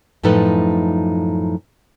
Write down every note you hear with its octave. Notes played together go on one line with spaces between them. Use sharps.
F#2 A2 F3 D#4 A4 B4